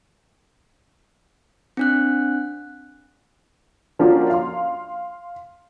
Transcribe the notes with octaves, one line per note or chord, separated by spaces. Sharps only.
C4 D4 F#6
F3 A#3 C#4 D4 F4 F#4
F5 C6